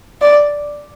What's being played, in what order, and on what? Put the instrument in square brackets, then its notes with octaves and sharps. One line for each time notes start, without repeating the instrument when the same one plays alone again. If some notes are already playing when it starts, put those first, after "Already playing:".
[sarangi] D5